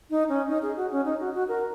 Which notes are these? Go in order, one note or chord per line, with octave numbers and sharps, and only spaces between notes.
D#4
C#4
D#4
G#4
F#4
C#4
D#4
F#4
F#4
A#4